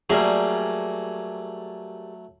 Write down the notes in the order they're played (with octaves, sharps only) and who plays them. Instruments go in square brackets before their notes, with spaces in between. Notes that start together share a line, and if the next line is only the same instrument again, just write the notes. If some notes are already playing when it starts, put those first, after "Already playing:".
[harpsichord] F#3 A3 [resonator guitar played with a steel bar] G3 A#3 G#4